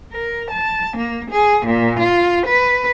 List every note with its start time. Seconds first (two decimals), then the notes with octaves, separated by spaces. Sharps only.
0.13 A#4
0.51 A5
0.98 A#3
1.31 G#4
1.66 A#2
2.00 F4
2.47 B4